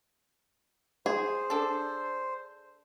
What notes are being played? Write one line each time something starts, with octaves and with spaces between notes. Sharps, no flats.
G#4 C5
D4 A4